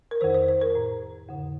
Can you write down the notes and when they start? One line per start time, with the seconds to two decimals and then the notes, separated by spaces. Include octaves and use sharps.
0.11 A#4
0.21 F2 D#3 C5
0.34 C5
0.48 C5
0.62 A#4
0.75 A2
1.29 F2 D3